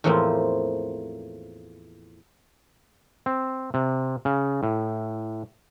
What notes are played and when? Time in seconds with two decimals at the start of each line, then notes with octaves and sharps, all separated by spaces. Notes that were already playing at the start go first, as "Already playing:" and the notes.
0.04 E2 A2 F3 A3 A#3 C4
3.26 C4
3.74 C3
4.25 C#3
4.63 A2